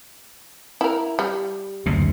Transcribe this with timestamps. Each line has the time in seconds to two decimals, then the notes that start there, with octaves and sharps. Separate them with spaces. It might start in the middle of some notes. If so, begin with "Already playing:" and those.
0.81 E4 A#4
1.19 G3
1.86 F#1 D2 C3